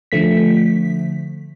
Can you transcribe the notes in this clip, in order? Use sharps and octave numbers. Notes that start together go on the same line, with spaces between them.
D3 F3 A3 B6